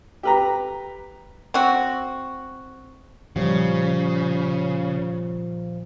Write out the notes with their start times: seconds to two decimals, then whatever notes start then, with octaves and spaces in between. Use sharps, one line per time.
0.23 G4 B4 A#5
1.54 C4 F#4
3.36 A#2 C#3 F3 G3